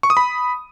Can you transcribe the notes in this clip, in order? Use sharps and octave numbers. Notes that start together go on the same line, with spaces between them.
C#6
D#6
B5